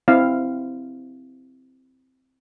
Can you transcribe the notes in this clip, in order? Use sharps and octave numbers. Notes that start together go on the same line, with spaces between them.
C4 E4 F5